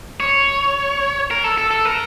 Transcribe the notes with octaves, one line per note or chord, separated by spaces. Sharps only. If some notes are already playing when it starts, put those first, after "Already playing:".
C#5
A#4
A4
A4
A4
A#4